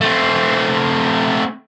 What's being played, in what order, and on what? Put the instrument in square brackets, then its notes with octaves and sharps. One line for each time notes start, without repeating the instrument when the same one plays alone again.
[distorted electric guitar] A3 C4